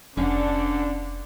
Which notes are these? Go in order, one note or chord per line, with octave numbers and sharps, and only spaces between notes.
F1 D3 C#4 D4 F5 F#5